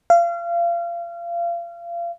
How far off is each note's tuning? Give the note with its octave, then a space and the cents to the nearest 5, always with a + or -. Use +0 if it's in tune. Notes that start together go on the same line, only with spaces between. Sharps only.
F5 -30